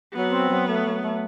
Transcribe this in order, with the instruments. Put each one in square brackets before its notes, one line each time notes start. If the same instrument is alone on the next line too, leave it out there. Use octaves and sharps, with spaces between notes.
[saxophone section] F#3 [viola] B3
[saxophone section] C4
F#3
A3
F#3
A3